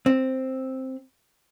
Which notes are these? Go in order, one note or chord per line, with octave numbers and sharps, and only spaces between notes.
C4